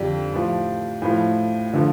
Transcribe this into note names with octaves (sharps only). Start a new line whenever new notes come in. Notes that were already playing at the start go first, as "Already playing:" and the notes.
Already playing: F2 D3 F3 D4 G4
A2 F3
A2 F3
D3 F3